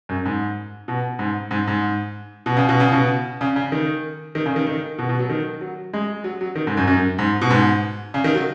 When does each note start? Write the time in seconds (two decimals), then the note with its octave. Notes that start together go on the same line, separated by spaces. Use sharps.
0.09 F#2
0.25 G#2
0.88 B2
1.19 G#2
1.51 G#2
1.67 G#2
2.46 B2
2.57 C#3
2.69 B2
2.80 C#3
2.92 B2
3.41 C#3
3.56 C#3
3.72 D#3
4.35 D#3
4.46 C#3
4.56 D#3
4.67 D#3
4.98 B2
5.09 B2
5.19 F#3
5.29 D#3
5.61 F#3
5.93 G#3
6.24 F#3
6.41 F#3
6.55 D#3
6.67 G#2
6.77 F#2
6.87 F#2
7.19 G#2
7.41 B2
7.50 G#2
8.14 C#3
8.24 D#3
8.34 F#3